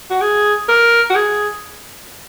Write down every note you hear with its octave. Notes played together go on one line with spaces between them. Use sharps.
F#4
G#4
A#4
F#4
G#4